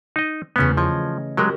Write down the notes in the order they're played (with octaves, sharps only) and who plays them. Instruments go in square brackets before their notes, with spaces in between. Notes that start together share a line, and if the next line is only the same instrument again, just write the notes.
[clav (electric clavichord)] D#4 D#5
[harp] E2 C#3 A3 [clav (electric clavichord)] B3 C#4
[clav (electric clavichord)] F3 [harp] C#5 D#5
[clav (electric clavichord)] F#3 G#3 [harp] F#4 G4 A#4